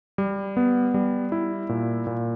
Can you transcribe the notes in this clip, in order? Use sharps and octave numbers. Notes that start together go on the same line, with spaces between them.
G3
B3
G3
E4
A#2
A#2